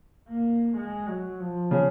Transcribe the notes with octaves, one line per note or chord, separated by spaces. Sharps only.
A#3
G#3
F#3
F3
C#3